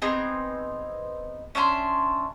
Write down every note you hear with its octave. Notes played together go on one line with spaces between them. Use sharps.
B3 C4 D#4 G#4
C#4 D4 E5 C6